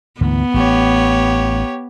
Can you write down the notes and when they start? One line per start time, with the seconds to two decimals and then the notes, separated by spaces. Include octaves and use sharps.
0.21 D2 G#2 E3 B3
0.54 A1 G4 C#5